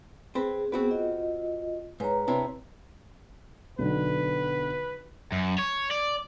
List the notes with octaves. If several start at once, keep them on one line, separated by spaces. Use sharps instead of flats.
C4 G#4 B4
B3 C4 F#4 G#4 B4
F4 D#5
G#2 B4 C#5 A#5
C3 D4 E4
B1 D3 B4
F#2
C#5
D5